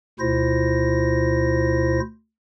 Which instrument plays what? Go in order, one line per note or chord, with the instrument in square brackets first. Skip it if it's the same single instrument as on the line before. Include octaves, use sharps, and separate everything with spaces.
[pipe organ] D2 B2 E4 F4 C5 A#6